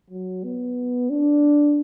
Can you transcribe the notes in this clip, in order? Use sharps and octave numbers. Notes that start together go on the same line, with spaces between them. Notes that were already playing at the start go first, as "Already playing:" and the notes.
F#3
B3
D4